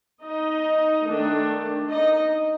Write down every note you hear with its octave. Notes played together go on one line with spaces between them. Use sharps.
D#4 D#5
D#3 A3 D4
D#4 D#5